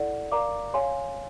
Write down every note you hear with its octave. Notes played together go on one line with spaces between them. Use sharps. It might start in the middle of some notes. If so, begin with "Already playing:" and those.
Already playing: E4 A4 D5 F#5
A#4 D5 F5 A#5 D6
C#5 F5 G#5 C6